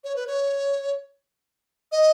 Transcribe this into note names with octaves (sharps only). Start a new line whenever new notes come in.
C#5
B4
C#5
D#5